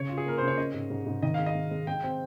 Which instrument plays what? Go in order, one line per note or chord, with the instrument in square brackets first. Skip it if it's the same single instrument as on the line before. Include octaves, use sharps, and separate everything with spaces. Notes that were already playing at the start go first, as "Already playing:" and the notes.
Already playing: [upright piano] C#3 [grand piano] C#5
[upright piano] F4
[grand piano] G#4
[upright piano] A#3 [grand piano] A#4
[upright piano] C#3 [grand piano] C5
[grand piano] C#5
[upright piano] C#4 [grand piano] D#5
[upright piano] G#2
G#2
G#2
[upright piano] D#3 [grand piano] D#5
[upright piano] G#3 [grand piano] F5
[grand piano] D#5
[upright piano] G#3
G#3
[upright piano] G#3 [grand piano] G5
[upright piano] C4